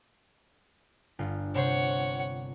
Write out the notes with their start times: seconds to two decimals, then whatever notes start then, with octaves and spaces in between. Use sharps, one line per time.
1.19 G1 F4
1.55 C3 C5 C#5 F#5 C7